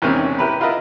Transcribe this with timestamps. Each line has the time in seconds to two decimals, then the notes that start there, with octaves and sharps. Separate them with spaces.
0.02 E2 G#2 C3 D#3 C4 C#4
0.39 E4 G4 A#4 B4
0.60 E4 F4 A#4 B4 D#5 E5